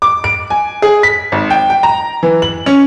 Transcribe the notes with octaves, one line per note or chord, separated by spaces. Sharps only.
D6
D7
G#5
G#4
B6
G#1
G5
G5
A#5
E3
F#7
C#4